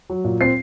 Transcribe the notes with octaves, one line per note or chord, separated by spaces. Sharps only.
F#3
A#2
C4 C7